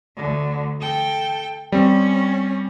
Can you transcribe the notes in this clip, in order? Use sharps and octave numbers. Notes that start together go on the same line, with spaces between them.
D2 D3
A4 G5
G3 C4 C#4